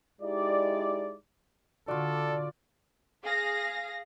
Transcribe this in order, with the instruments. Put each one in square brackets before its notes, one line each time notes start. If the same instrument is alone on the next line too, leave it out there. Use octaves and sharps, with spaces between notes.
[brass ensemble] G#3 D#4 E4 G4 D5
[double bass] D3 [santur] F4 F#4 [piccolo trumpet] A4 [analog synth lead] D5
[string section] G#4 F5 A#6